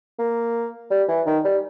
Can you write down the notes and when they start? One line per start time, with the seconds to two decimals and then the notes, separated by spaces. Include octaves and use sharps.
0.19 A#3
0.90 G3
1.08 E3
1.26 D#3
1.44 G3